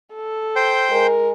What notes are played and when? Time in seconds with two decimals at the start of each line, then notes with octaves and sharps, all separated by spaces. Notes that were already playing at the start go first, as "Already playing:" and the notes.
0.14 A4
0.56 C5 G5
0.92 G#3 A#4